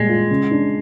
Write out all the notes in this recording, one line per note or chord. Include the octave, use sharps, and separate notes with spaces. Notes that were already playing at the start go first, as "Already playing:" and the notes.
Already playing: A#2 G3 G#3
F4
C#3
D4